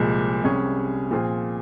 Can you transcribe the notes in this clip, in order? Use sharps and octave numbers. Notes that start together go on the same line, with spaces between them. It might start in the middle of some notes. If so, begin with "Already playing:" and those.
Already playing: C2 A#2 F3 G#3
C2 C3 G3 C#4 G#4
A#2 F3 C4 F4 G#4